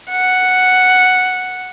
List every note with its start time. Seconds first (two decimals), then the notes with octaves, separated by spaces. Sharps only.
0.10 F#5